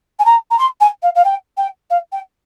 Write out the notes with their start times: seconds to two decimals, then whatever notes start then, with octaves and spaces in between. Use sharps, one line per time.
0.19 G#5
0.25 A#5
0.50 A#5
0.58 C6
0.80 G#5
1.02 F5
1.15 F5
1.24 G5
1.57 G5
1.90 F5
2.12 G5